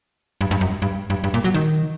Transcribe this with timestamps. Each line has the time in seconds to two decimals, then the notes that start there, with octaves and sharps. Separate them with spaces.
0.41 G2
0.51 G2
0.61 F#2
0.82 G2
1.10 G2
1.24 G2
1.34 A#2
1.44 F#3
1.54 D#3